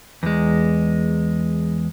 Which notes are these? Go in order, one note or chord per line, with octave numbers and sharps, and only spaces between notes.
E2 G#3